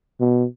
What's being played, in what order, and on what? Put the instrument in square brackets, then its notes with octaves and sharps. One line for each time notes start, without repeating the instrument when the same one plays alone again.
[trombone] B2